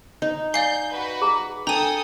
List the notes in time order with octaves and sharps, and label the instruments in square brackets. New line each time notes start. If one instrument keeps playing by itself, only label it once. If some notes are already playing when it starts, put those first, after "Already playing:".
[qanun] D#4
[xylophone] D5 F5 C7 [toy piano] G#5 [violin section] G6
[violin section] F#4 B4
[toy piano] G#4 A#5
[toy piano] D4 [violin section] A4 G#5 D#6 [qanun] G5 [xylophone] A#5 D#7